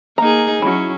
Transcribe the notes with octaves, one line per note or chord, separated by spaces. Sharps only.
A#3 D#4 G#4 A#5
F#3 C#4 E4 F#4